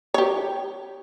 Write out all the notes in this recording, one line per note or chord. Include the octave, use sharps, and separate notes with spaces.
G4 C#5